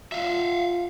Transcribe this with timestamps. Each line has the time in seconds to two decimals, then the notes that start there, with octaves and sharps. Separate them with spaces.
0.12 F4 E5 F5